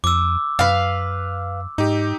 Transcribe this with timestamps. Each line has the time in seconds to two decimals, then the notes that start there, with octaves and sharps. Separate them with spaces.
0.04 F2 D6 E6
0.59 F#2 B4 F5
1.78 G#2 D#4 G4